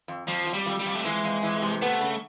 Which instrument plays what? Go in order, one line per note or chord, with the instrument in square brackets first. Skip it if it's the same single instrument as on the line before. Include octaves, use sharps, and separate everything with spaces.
[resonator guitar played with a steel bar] F2
[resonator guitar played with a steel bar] F2 [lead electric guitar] F3
[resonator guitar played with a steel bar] F2
[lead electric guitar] G3
[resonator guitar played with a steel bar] F2
[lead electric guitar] G3
[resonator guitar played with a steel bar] F2
[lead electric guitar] A3
[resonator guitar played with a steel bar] E3 [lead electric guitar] G#3
[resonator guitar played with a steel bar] F2
E3
C3
[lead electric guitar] A3 [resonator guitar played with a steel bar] B3
[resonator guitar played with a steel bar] C#3